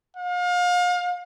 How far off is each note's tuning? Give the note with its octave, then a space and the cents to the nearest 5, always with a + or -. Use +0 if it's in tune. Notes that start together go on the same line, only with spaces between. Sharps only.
F5 +35